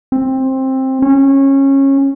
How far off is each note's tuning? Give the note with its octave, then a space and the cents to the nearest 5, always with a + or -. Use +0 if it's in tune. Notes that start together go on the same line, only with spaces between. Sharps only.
C4 +15
C#4 -20